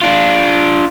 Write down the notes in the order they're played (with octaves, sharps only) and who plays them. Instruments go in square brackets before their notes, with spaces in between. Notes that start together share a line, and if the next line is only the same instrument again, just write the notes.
[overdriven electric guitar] D4 F4